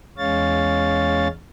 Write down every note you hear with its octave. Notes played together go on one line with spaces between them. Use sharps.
E2 G#3 C#4 C#5 F5 A6